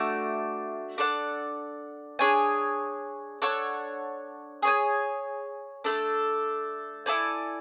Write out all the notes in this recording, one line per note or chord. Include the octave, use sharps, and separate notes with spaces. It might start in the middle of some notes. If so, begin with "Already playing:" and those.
Already playing: A3 D4 F#4
D4 A4 D5 F#5
D4 G#4 C#5 G#5
D4 A4 C#5 F#5
G#4 C#5 G#5
A3 D4 A4
E4 A4 D5 G#5